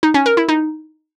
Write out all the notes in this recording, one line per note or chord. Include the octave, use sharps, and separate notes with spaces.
D#4
C#4
A#4
E4
D#4